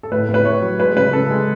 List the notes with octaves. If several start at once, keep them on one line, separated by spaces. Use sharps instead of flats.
A4
A2 B4
A2
B4
A3 C#5
F#3
G#3 B4
C#3 B4
C#3 A4
G#3